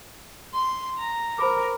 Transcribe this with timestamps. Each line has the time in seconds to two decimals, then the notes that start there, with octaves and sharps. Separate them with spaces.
0.54 C6
0.98 A#5
1.38 A#4 C5 B5 D6